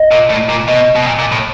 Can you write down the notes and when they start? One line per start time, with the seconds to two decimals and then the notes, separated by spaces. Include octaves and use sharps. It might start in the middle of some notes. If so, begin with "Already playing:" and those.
Already playing: D#5
0.11 A#2
0.30 A2 D5
0.49 A#2
0.68 B2 D#5
0.96 B2
1.06 A#2
1.19 A#2
1.32 A2